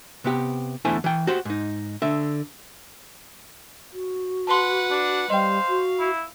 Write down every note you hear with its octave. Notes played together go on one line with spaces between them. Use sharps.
C3 B3 G4
E2 D3 A3 E4 C5 G#5
E3 G5
F#4 G4 C5
G#2 D#4
D3 E5
F#4
B4 F#5 A5 C6
D4
G3 C5 D#5 F5 G5
F#4
E4